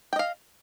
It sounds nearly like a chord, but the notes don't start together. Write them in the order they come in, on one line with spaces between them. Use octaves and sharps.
G5 D#5 F5